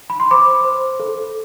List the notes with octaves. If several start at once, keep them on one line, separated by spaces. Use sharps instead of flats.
B5
C6
C5 B5 D6
C5
A4